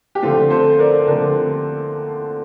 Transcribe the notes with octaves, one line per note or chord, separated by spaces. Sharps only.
G4
D3 F3 A3 C4 F4 A4
A4 C5
A#4 D5
D3 F3 A3 C4 A#4 D5